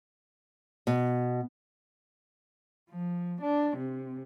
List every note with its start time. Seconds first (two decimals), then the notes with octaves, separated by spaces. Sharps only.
0.87 B2
2.90 F3
3.42 D4
3.77 C3